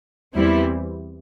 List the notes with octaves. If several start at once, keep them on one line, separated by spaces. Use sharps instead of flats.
E2 E3 G3 C4 E4